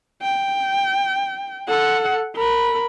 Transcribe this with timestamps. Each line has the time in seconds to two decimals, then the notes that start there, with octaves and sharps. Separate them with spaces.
0.22 G5
1.68 A4 F#5
2.36 A#4 B5